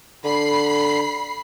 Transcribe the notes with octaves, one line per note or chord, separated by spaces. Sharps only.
D3 B5 C7